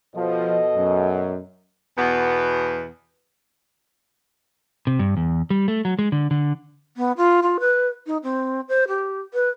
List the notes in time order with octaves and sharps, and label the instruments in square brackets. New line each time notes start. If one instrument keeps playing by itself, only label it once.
[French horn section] B2 A4 D#5 [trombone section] F3
[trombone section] F#2
[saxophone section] E2 B2 B3
[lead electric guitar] C3
G2
E2
G3
A3
F#3
G#3
D3
D3
[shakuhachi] B3
F4
F4
B4
D#4
C4
C5
G4
B4